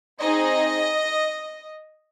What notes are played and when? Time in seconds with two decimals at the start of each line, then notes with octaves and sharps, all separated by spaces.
0.21 C4 D#4 G#4 D#5